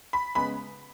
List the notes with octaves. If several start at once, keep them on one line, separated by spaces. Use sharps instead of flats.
B5
C#3 G#3 B3 B5